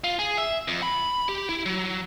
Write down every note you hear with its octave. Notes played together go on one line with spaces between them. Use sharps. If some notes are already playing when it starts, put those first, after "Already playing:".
F4
G#4
E5
F2
B5
G4
E4
F#3